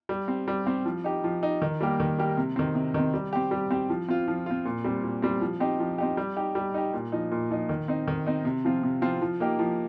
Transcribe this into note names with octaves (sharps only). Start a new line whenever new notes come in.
G3
C4 G4
G3
C4 G4
F3
D#4 G4
F3
D#4 G4
D#3
G3 A#3 G4
D#3
G3 A#3 G4
C3
D#3 C4
C3
D#3 C4
G3
C4 G4
G3
C4 G4
F3
C4 F4
F3
C4 F4
A#2
G3 C4
A#2
G3 C4
F3
C4 D#4 G4
F3
C4 D#4 G4
G3
D#4 G4
G3
D#4 G4
A#2
F3 D#4
A#2
F3 D#4
D#3
C4 D#4
D#3
C4 D#4
C3
F3 C4 F4
C3
F3 C4 F4
F3
A#3 D#4 G4
F3